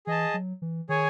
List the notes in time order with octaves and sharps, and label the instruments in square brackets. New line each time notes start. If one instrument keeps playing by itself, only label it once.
[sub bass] E3 [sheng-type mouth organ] G#4 D#5 A5
[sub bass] F#3
E3
[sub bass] D#3 [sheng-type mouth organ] G#4 C#5 G#5